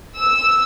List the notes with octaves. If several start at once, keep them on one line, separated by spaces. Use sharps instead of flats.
E6